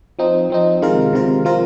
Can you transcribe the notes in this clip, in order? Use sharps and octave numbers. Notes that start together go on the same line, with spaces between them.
F3 C4 D#4
F3 C4 D#4
C3 D#3 G#3 F4 A#4
C3 D#3 G#3 F4 A#4
F3 C4 F4 A#4